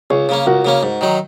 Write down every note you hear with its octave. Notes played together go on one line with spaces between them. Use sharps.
C#2 G#4 C#5
C#3 A#3 C#4
C#2 F#4 A#4
C#3 A#3 C#4
G#2
D#3 F#3 D#4